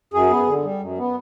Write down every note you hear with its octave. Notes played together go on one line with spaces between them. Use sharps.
F#2 G#4
B3
D3
G3
F#2
B3